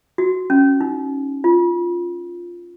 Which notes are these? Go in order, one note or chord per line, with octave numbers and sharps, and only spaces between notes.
F#4
C#4
D#4
F4